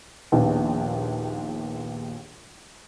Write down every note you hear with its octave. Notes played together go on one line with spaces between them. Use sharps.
A#1 D#2 B3